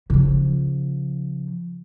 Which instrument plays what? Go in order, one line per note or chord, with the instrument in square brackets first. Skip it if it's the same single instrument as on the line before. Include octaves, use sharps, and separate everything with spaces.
[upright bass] C#3 F3